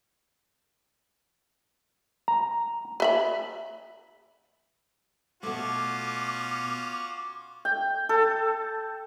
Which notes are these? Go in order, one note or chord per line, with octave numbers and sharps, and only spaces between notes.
A#5
B4 E5 B5
B2 A3 C#4 F4 F#4 D6
G5
A4